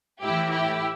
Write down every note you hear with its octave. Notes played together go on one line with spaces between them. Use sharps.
A2 E3 E4 G4
E4 G4